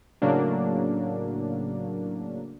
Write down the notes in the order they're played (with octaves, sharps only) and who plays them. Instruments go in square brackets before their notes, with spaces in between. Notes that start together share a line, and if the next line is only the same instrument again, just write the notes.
[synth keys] A2 C#3 F#3 A#3 D4